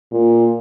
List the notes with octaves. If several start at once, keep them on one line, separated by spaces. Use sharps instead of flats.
A#2